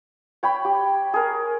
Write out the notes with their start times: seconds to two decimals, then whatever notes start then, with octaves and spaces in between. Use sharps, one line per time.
0.43 C#5 G5 B5
0.65 G4
1.14 G#4 A#4